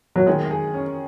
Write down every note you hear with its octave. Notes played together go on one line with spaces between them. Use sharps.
F#3
D#3 G#3
G#4
C#4